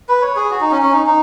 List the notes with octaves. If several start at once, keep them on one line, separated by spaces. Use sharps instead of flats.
B4
C#5
G#4
F#4
D#4
C#4
C#4
D#4
D#4